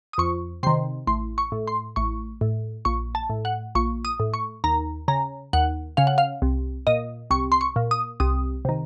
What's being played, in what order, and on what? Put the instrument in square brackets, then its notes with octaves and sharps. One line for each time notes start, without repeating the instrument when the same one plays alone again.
[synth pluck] D#6
F2 C#6
C3 D#3 C6
A1 C6
C#6
A2
C6
A1 C#6
A2
A#1 C#6
A5
A2
F#5
A#1 C#6
D#6
A2
C#6
D#2 A#5
C#3 A#5
D#2 F#5
C#3 F5
F#5
F5
C2
A#2 D#5
C2 C#6
C6
C#6
A#2
D#6
C2 D#6
C3 D#3